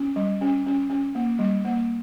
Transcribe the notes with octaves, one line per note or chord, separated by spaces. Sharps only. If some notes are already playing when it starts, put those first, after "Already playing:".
Already playing: C#4
G3
C#4
C#4
C#4
A#3
G3
A#3